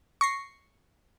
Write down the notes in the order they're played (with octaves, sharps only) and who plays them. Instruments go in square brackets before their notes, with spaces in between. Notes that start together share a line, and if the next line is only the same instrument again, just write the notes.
[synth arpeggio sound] C#6 A#6 C7